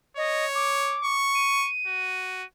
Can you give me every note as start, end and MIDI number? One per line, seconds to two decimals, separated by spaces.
0.17 0.99 73
0.17 0.45 75
0.55 1.15 86
1.05 1.69 85
1.35 2.45 99
1.87 2.45 66